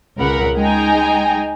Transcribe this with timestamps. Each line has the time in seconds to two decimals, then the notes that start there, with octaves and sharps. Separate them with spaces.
0.18 C#2 A#4 F#5 B5
0.56 G#3 D#4 G5 G#5 A#5